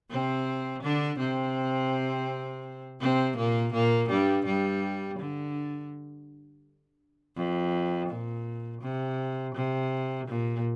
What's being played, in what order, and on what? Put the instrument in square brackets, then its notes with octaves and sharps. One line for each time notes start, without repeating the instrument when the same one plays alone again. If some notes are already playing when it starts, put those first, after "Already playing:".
[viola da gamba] C3 C4
D3 D4
C3 C4
C3 C4
A#2 A#3
A#2 A#3
G2 G3
G2 G3
D3
F2
A#2
C3
C3
A#2